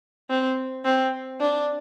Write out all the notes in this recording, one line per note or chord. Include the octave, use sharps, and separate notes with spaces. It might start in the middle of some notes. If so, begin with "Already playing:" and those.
C4
C4
D4